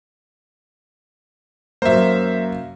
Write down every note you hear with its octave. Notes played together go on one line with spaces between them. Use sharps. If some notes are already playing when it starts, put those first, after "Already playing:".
F#2 A#3 C5 E5